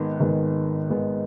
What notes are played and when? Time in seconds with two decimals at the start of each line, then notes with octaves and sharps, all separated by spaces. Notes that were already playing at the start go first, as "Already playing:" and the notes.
Already playing: G#1 G#2 D#3 G#3 B3
0.20 G#1 G#2 D#3 G#3 B3
0.90 G#1 G#2 D#3 G#3 B3